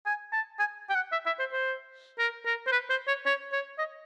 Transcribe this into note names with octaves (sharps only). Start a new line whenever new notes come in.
G#5
A5
G#5
G5
F#5
E5
E5
C5
C5
A#4
A#4
C5
B4
C5
C#5
C#5
C#5
D#5